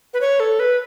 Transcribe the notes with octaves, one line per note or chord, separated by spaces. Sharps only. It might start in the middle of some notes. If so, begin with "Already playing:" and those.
B4
C#5
A4
B4